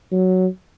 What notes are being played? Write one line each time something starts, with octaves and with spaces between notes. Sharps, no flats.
F#3